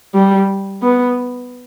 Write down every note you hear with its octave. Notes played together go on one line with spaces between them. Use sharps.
G3
B3